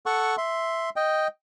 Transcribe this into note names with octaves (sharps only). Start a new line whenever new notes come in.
A4 F#5 C#6
E5 C6
D#5 G5